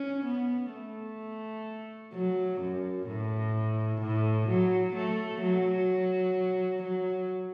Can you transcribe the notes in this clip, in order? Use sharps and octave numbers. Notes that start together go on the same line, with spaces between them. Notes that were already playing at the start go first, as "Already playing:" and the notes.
Already playing: C#4
B3
A3
F#3
F#2
A2
A2
F#3
A3
F#3
F#3